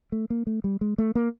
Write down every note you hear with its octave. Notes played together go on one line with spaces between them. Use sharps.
A3
A#3
A3
G3
G#3
A3
A#3